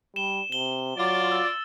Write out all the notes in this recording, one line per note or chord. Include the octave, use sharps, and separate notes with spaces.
G3 E7 G7
C3 G7
F#3 F4 D5
E6 A6